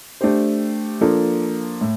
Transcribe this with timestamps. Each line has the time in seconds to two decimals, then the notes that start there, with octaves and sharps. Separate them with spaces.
0.21 A3 D4 G4 C5
1.01 F3 A#3 D4 A4
1.81 A2